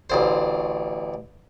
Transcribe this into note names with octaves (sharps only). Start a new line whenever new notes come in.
A1 D2 C5